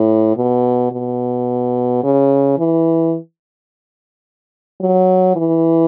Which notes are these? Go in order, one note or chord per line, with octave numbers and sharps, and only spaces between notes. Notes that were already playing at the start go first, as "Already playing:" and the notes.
Already playing: A2
B2
B2
C#3
E3
F#3
E3